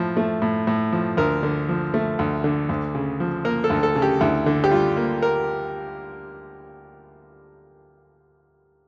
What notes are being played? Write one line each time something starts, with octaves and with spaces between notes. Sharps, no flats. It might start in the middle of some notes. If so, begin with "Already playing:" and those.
Already playing: A2 F3
A3
A2
A2
F3
D2 A#4
D3
F3
A3
D2
D3
D2
C#3
F3
A#3 A#4
A4
D2
A4
C#3
G4
D2 E4
D3
G4
G3 F4
A#3
A#4